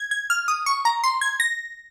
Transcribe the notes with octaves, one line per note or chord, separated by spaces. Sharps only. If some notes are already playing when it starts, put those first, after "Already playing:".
Already playing: G#6
G#6
F6
D#6
C#6
A#5
C6
G#6
A#6